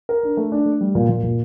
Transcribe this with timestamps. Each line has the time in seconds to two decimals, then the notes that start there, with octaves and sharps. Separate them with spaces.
0.09 A#4
0.23 D4
0.37 A3
0.52 D4
0.66 A3
0.81 G3
0.95 A#2
1.09 A#2
1.23 A#2